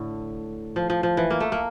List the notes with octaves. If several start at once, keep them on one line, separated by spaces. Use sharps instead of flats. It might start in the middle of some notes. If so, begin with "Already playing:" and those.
Already playing: A2 D3
F3
F3
F3
E3
A#3
A3
A#3